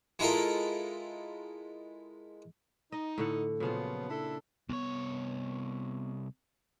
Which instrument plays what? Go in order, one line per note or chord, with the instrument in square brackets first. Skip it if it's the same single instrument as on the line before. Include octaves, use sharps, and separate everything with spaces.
[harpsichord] G#3 E4 F4 A4 A#4
[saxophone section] D#4 [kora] D#5
[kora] A2 D3 F#5
[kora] A#2 C#3 F4 [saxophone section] F3 F#3 B3
[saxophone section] D4 E4 A4
[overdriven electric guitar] C2 C#5 [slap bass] B3